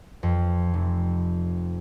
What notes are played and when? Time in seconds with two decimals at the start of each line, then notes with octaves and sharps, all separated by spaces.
0.23 F2
0.74 F1